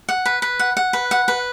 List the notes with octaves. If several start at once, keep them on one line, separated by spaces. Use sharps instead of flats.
F#5
B4
B4
F#5
F#5
B4
F#5
B4